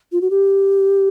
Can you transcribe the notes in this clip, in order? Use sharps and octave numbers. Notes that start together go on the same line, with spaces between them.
F4
F#4
G4